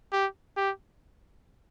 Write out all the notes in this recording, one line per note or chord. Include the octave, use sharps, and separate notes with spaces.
G4
G4